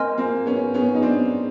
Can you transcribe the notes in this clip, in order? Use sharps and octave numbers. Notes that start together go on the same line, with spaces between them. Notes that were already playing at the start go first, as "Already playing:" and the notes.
Already playing: A#3 C4 D#5 G#5 C6 F6
A#3 C4
B3 C#4
B3 C#4
D#4
C4 D4